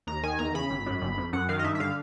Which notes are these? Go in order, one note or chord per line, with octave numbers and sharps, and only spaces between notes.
D#2 A#5
D#3 G#5
E2 A#5
C#3 B5
G#1
F#2
G1
F2
F#2 F#5
D#3 F5
D#5
G2 E5
E5
D3 F5